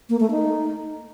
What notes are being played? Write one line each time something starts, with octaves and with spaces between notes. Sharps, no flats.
A#3
A3
D#4